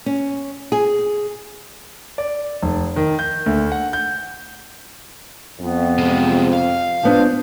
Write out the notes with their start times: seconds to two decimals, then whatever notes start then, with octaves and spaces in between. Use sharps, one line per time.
0.06 C#4
0.72 G#4
2.18 D5
2.62 F1
2.96 D#3
3.19 G6
3.46 D2
3.72 F#5
3.93 G6
5.60 F2 B3
5.98 C3 G#3
6.53 F5
7.03 F3 B3 D4 C5